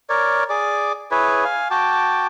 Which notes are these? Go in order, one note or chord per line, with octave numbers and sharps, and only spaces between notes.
A#4 C#5 D5
G#4 D5 D6
E4 G#4 B4 C#5
F5 G#5
F#4 G5 A5 D6